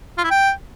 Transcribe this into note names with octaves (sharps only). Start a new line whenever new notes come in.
F4
E4
G5